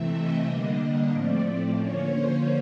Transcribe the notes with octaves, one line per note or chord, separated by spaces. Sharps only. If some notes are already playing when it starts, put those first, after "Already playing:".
Already playing: C3 E3 A3 C4 E5
D#5
D3 G3 A#3 D4 D#5
A2 F3 A3 C4 D5
D3 F3 A#3 C#4 C#5
C5